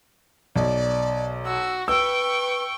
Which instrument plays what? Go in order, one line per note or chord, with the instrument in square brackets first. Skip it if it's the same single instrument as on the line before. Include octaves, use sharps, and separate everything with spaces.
[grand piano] B1 [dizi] D5
[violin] F#4 [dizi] E6
[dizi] B4 [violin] G5 C#6 [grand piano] E6